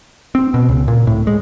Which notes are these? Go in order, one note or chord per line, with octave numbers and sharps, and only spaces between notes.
C4
B2
C#2
A#2
A2
G#3